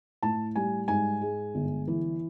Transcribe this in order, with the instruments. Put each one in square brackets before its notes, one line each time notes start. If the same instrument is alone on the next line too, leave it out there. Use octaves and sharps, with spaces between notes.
[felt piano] A2 A5
G3 G#5
G#2 G#5
G#3
G1
E3